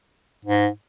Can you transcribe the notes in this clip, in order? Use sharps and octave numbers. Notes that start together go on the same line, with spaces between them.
G#2